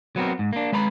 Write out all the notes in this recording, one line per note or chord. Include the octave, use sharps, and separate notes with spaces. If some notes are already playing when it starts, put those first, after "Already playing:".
F#3 B3 C4 A#4
G#2
A#3 D4
G#3 B4 A#5 B5